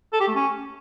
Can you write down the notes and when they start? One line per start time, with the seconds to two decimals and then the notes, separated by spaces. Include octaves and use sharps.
0.13 A4
0.20 G4
0.28 A3
0.35 C#4